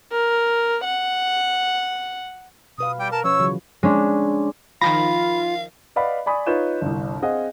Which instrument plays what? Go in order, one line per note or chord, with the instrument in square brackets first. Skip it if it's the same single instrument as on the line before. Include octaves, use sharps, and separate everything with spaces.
[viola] A#4
F#5
[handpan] B2 B4 F5 [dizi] D#6
[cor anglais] G3 [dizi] G5
[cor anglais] A#4 [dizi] A5
[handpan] F3 C#4 B4 [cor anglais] C#5 [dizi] E6
[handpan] C#3 E3 F#3
[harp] G#3 C#4 D4
[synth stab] D#3 F3 A#6 [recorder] F4 [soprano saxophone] F5 [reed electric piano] B5
[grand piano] B4 D5 D#5 F5 F#5 B5
D5 G#5 B5 C#6 D#6
D#4 F4 B4 C#5 G6 E7
G1 C2
C4 G#4 D#5 F5 F#5